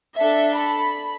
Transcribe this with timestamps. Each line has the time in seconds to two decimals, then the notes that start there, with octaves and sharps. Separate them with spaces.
0.17 D4 A4 E5
0.55 B5